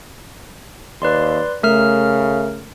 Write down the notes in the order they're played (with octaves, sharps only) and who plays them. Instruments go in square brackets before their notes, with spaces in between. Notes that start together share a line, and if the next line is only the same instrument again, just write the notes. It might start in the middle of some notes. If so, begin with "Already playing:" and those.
[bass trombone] D#2 [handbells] B4 D5 C6
[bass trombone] C#3 [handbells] A3 A#4 F6